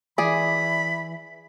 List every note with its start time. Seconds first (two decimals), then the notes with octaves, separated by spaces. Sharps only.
0.18 E3 G#4 D5 B5